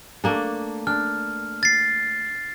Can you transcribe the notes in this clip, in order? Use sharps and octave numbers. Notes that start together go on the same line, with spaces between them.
A3 A#3 D4
D4 F6
A6 C7